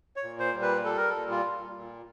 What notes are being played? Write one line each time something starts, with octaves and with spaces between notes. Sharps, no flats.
C#5
A#2
C5
G3
B4
G3 A4
A#4
A4
A#2
F4
A#2
A#2